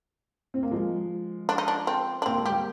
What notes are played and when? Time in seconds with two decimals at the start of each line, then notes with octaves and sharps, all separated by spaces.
0.54 C4
0.63 A#3
0.71 F3 G#3
1.49 D4
1.58 D#4
1.68 D4
1.87 C4
2.22 D4
2.26 A#3 C4
2.38 G#3
2.46 G3 A#3 G4